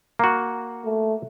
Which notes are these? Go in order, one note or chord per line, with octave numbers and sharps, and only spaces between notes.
A#3 F#4
A3